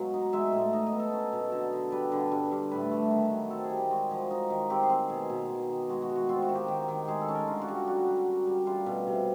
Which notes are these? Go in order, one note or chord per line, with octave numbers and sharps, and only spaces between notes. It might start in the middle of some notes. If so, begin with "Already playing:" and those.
Already playing: B2 F#3 G#3 F5
D#4
G#3 E5
A2
D#4 D#5
D#5
B3
A4
C#4
B2
D3 A4
D3
G3 B4
D3
G2
G2
A2 B4
A3
D#3
F#3
C4 A4
G#4
G3
G4
G#3 F#4
F3
D#4
D#3
C4 G4
G#4
C4
B2 G#4
B2
D#3
D#3
G#3 F#4
F#4
G#3
F#4
C4 F4
F#4
D#3
G4
D#3
D#3
G#3 G#4
A4
C#4
A#4
D3 F4
F#4
G3
F#4
F#3 F#4
F#3
G3
G3
G3 F4
B2
C3